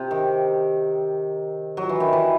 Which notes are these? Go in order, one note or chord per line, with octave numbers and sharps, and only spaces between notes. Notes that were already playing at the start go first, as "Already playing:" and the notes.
Already playing: C3
D#3
F#3
E3
D#3
E3